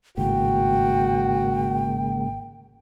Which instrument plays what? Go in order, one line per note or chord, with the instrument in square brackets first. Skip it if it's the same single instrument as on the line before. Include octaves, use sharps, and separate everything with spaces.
[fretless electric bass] G#1 A2 [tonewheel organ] C#3 G#3 A#3 [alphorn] F#4 [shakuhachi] G5